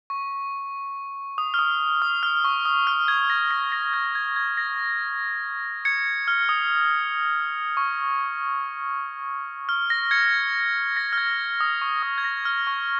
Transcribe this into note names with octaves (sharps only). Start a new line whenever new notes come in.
C#6
D#6
F6
D#6
D#6
F6
C#6
D#6
F6
G#6
A#6
A#6
A#6
G#6
G#6
G#6
A#6
G#6 C#7
F6
D#6
C#6
F6
A#6
G#6 C#7
A#6
F6
G#6
D#6
C#6
D#6
G#6
A#6
F6
C#6